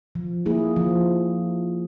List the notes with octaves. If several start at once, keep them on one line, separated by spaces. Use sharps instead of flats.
F3
A#3 E4 G#4
F3